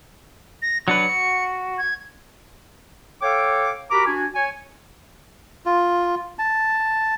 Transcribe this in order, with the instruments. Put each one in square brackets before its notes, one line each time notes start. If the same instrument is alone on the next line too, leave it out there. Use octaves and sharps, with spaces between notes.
[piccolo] A#6
[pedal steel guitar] F#3 D4 B4 [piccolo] C#7
[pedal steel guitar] F#4
[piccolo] G#6
[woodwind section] A4 C#5 F5 G5 D6
F#4 G4 A#4 A#5 B5 D6
D4 F#4 G#5
C#5 G#5
[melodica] F4
A5